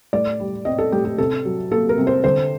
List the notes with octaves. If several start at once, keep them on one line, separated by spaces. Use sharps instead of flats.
A2 D5
G3
C4 D#5
A4
A2 G4
G4
C3 A4
F#3
A#3 A4
A#4
C3
C5
D3 C5